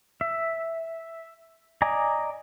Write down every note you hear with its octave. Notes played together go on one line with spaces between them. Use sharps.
E5
D5 D#5 G#5 A#5